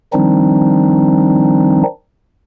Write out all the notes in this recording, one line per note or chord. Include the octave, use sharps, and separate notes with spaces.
D#3 F3 G3 C4 D4 D#4